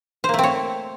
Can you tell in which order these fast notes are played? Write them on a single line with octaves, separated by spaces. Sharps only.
C5 A#3 A3 C4 C#5